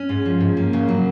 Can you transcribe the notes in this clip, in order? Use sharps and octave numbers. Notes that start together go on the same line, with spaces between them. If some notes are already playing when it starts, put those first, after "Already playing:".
Already playing: C#4
G#2
F3
G#2
A#3
C#3
F#3